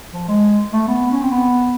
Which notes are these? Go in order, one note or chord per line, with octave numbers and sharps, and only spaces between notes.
F3
G#3
A3
B3
C#4
C4
B3